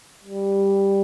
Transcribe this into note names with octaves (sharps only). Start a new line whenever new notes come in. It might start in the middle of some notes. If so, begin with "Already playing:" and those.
G3